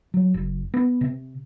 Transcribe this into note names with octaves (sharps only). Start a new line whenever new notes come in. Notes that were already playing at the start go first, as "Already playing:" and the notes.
F#3
F#1
B3
C3